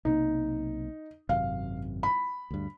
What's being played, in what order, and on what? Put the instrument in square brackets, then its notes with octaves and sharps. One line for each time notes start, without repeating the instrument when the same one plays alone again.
[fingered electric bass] B1 C3 A#3 [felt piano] D#4
[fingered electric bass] G#1 F#2 C3 [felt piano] F5
[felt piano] B5
[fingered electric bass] D2 G2